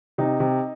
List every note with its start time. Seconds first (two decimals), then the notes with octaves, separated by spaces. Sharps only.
0.18 C3 D#4
0.40 C3